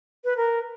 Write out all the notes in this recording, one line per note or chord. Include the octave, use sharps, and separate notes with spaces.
B4
A#4